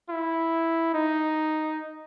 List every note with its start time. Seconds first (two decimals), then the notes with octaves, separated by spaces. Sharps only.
0.10 E4
0.95 D#4